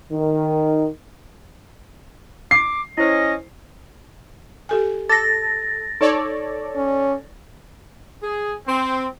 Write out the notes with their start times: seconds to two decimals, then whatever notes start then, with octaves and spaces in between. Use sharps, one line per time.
0.12 D#3
2.51 D6 C7
2.98 C#4 E4 C5 D#5 A#6
4.69 G4 A4 G#5
5.09 A4 D6 A6 A#6
6.01 D#4 A4 C#5 D5
6.76 C#4
8.23 G#4
8.67 C4